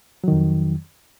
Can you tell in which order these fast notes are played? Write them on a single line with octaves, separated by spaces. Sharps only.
F#3 D#3 F2